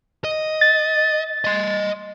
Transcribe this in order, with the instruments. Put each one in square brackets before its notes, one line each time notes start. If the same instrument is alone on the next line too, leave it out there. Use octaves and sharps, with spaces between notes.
[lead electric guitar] D#5
[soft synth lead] A6
[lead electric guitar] D#5 C6